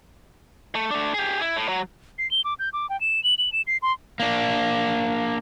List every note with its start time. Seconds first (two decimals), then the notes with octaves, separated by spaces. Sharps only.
0.75 A3
0.91 A3 D4
1.14 G4 G#4
1.41 E4
1.56 A2
1.68 F#3
2.18 C7
2.31 G7
2.44 D6
2.59 G6
2.73 D6
2.90 G5
3.01 E7
3.24 F#7
3.38 F#7
3.52 E7
3.67 C7
3.82 C6
4.20 A#3 D4